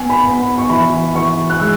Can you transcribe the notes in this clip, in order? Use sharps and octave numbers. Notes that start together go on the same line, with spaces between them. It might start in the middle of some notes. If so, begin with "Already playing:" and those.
Already playing: B3 G#5
B5
B3
B5
C#6
E3 B5
E3 C#6
F#6
G#3 E6